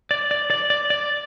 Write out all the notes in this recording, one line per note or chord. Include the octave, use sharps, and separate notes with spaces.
D5
D5
D5
D5
D5